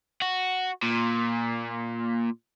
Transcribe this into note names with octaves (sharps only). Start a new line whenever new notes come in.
F#4
A#2